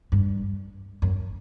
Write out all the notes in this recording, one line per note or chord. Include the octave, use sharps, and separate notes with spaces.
G2
F#2